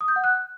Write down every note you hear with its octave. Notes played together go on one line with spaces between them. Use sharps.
D#6
G6
F#5
F#6